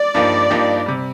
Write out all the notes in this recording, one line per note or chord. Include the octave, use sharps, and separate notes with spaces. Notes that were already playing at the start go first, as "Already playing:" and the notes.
Already playing: D5
G2 F3 A#3 D#4 G4
G2 F3 A#3 D#4 G4
C3 G3